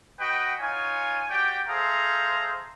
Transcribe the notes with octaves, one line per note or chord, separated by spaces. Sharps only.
F#4 B4 D#5 F#5 G5
D#4 F4 C#5 G#5
F#4 G4 D5 G5
G#4 A4 C5 E5 F5 A#5